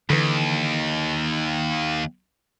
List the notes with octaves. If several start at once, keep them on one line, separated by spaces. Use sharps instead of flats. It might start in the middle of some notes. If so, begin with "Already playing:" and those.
D#2 D3 E3